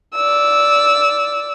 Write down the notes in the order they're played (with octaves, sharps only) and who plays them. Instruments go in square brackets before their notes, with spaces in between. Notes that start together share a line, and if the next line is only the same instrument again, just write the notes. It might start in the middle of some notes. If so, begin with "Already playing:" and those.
[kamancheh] D5 E6